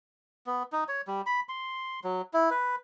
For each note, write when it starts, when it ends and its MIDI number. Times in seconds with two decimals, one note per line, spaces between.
0.46 0.63 59
0.72 0.84 63
0.88 1.01 73
1.07 1.22 55
1.26 1.40 83
1.49 2.00 84
2.04 2.22 54
2.33 2.50 64
2.51 2.76 71